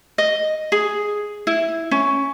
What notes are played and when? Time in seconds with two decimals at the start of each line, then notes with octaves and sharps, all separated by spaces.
0.18 D#5
0.72 G#4
1.47 E4
1.91 C#4